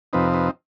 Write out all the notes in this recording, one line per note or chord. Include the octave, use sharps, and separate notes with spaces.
F2 C3 F3 C4 D#4 B4
B4